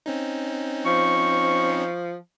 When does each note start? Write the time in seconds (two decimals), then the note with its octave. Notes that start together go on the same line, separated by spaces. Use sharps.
0.06 C4 C#4 D#4
0.86 F3 C#6